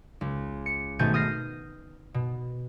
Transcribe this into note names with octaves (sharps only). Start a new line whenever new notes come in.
C#2
C#7
G#1 B2 A3 G#5 G6 A6
D#6 F6 G6 A#6 C7
B2